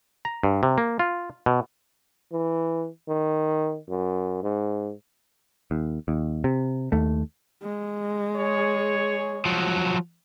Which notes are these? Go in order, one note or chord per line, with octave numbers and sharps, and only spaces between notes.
A#5
G2
C3
A#3
F4
B2
E3
D#3
F#2
G#2
D#2
D#2
C3
D#2 A3
G#3
G#4 C#5
F3 F#3